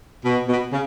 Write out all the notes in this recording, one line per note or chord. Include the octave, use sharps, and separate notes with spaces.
B2
B2
C#3